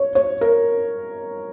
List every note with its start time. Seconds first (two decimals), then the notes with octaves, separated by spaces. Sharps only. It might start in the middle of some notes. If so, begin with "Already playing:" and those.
Already playing: C#5
0.15 C#5
0.41 A#4